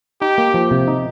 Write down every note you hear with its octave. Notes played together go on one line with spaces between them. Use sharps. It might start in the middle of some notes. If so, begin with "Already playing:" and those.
D#4 G4
A#3
F3
C3
D#4